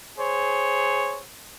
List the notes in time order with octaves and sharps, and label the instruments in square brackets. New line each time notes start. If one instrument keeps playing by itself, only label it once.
[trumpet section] G#4 C5 C#5